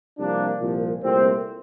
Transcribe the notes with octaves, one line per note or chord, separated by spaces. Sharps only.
C2 C3 F3 A#3 D4
C2 A#2 F3
C2 A#2 A3 C4